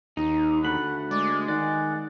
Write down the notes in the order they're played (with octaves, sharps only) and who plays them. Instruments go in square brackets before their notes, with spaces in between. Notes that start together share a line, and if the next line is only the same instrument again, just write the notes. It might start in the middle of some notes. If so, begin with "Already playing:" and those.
[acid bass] D#2 [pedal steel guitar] D#4
[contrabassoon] D2 [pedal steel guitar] A3 B5 [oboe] F#5
[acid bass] G#3 [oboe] D5
[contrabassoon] D#3 [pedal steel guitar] D5 [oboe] F#5